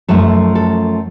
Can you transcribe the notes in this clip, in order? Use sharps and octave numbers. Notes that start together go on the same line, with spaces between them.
F#2 F3 A3 A4
A4